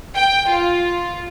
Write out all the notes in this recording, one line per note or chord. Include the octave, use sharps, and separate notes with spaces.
G5
F4